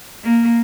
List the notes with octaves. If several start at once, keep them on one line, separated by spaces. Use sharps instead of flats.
A#3